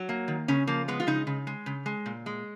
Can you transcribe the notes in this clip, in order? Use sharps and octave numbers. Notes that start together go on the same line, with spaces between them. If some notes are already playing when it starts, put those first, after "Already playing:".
Already playing: F#3
A#3
D#3
C#3 C#4
F3 A#3
G#3 B3
F4
C#3 D#4
C#3
G#3
C#3
G#3
A#2
G#3